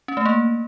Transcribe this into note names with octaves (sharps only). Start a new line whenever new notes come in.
C#4
A3
A#3